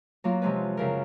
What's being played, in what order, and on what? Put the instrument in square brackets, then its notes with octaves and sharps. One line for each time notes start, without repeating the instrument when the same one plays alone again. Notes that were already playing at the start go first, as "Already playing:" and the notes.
[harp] F#3 A#3 F4
C3 F3 G#3 C#4 B4
F#2 C#3 A#4